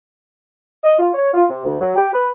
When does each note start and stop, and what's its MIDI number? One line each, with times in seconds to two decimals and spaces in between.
0.84 0.93 75
0.99 1.10 65
1.14 1.29 73
1.34 1.44 65
1.49 1.65 48
1.65 1.77 38
1.81 1.91 54
1.96 2.11 67
2.14 2.30 71